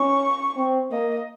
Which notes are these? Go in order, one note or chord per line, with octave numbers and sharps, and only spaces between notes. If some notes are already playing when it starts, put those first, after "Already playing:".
Already playing: C#4 C#6
C4
A#3 D#5